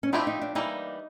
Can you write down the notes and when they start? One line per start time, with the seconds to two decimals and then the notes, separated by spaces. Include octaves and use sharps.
0.03 C#4
0.13 F3 A3 C4 D4 E4 G4
0.27 D#4
0.42 D4
0.55 E3 G3 A#3 D#4